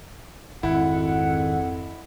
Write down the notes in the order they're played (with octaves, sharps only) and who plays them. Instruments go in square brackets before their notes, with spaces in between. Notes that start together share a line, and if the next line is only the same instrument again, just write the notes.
[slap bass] G#1 [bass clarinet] F2 [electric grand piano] E4 [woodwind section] F#5